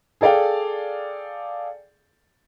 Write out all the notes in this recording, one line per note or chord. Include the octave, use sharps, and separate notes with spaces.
G#4 A4 D5 F5 G5